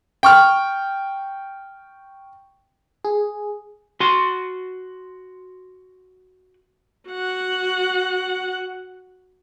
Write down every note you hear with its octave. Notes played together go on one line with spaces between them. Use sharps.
G5 C#6 F6
G#4
F#4 C6
F#4 F#5